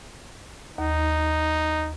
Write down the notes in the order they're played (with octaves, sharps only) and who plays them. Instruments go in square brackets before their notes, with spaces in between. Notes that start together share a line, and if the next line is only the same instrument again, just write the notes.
[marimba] D#2 [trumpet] D#4